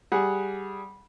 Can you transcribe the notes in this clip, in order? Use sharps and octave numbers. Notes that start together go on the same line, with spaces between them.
G3 G#4 F#5